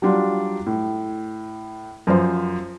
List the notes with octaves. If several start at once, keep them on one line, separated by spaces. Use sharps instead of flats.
F#3 G3 D4 F4
A2
F#2 F3 C5